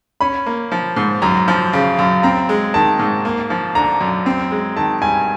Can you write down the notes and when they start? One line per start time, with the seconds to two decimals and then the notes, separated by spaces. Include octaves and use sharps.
0.20 C#4 B5
0.46 A#3
0.71 F3
0.96 G#2
1.22 F#2 A#5
1.48 F3
1.73 C#3
1.99 F#2
2.23 C4 A#5
2.49 G#3
2.74 D#3 A5
2.99 G#2
3.25 A#3
3.50 F3
3.75 D3 A#5
4.01 F#2
4.26 C4
4.51 G#3
4.76 D#3 A5
5.02 G2 G#5